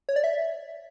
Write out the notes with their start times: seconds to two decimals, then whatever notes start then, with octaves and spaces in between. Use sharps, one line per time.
0.09 C#5
0.16 D5
0.24 E5